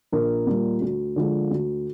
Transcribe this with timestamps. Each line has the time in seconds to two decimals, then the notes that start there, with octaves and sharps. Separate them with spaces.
0.12 A#1 A#4
0.47 A#2 G3
0.81 D2
1.16 D3 F3 G#3
1.51 D2